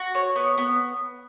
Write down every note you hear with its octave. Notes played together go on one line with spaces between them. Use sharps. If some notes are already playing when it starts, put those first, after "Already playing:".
Already playing: F#4
C#5
B3
B3